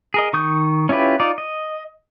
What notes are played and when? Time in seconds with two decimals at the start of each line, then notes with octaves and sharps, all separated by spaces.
0.14 G#4 A#4 D#5
0.33 D#3 C#6 D#6 G6
0.89 C#4 E4 F4 G4 B4
1.20 D#4 F4 D5
1.38 D#5